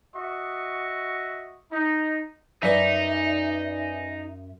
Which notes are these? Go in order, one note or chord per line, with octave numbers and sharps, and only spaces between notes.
F#4 D#5 E5 C#6
D#4
F#2 D#4 B4 D5 E5 G#5